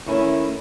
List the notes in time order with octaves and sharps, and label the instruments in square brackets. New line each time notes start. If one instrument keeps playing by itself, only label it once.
[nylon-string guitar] D#3 A3 C#4 E4